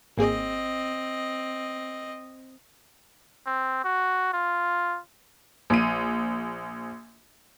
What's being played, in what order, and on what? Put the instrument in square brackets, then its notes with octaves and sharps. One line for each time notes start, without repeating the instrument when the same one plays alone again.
[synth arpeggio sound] G#1 A#3 G#4 [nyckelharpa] C4 D#5
[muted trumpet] C4
F#4
F4
[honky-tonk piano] A#1 D#7